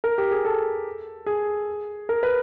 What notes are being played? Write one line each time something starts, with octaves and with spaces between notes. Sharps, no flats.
A#4
G4
G#4
A4
G#4
A#4
B4